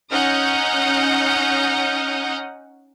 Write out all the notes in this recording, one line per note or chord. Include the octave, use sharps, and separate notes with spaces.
C#4 D#4 F#5 D#6 F6 G6